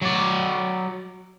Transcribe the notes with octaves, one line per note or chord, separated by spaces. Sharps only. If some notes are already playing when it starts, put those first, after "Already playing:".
F#3 D5